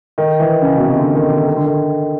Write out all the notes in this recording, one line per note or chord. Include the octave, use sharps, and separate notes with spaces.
D#3
E3
C#3
B2
C3
D3
D#3
D3
D#3
D3
D#3